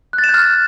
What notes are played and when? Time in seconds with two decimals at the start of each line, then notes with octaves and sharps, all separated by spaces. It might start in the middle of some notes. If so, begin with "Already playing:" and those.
0.13 F#6
0.18 A6
0.24 E7
0.29 G6
0.34 F6